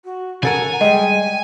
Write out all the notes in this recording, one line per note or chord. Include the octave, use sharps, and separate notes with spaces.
F#4
C#3 A4 A#4 F#5 G#5
G3 G#3 D#5 G5